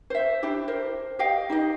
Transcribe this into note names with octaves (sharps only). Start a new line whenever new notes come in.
C5 E5
D4 E4 G4
A#4 C5
G4 D#5 F5 G5
D#4 G4 D#5